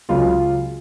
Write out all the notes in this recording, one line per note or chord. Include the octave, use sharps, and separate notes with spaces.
C#2 C#3 F#3 F4 F5